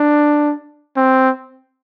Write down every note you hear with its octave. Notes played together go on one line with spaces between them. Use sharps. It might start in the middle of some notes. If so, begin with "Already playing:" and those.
Already playing: D4
C4